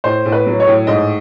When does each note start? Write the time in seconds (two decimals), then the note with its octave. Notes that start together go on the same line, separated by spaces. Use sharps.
0.04 A2 C5
0.26 A2
0.32 B4
0.46 F#3
0.60 C#5
0.67 A2
0.87 G#2 D#5